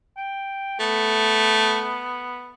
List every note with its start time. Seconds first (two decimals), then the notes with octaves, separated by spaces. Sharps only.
0.17 G5
0.80 A3 B3